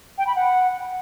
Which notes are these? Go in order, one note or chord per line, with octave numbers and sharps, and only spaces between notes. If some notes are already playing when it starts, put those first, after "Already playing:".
G5
B5
F#5